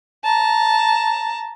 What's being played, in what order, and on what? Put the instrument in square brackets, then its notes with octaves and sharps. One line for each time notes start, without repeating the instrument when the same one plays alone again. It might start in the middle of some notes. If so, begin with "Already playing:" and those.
[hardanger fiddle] A5 A#5